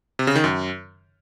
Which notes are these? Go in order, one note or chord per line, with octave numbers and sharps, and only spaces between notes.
C3
C#3
D#3
F#2